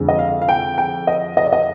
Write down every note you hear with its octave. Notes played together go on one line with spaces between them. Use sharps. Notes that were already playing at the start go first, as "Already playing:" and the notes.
Already playing: F2 D3 G#3
D#5
F5
F5
G5
G5
D#5
D#5
D5
D#5